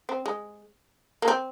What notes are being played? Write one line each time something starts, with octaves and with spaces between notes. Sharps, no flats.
C4
G#3
A#3
C4